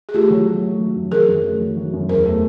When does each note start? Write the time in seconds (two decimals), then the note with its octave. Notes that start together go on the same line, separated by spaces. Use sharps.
0.09 G#4
0.14 A3 F4 G4
0.30 F#3
0.47 A3
0.64 A3
0.79 F#3
0.96 F#2
1.12 F#2 G#4 A#4
1.28 F#2
1.44 A3
1.61 F#3
1.77 F#3
1.93 F#2
2.09 E2 A#4 C5
2.25 A3